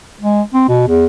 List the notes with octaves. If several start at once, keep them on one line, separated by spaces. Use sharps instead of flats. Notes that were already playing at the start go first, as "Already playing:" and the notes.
G#3
C4
B2
E2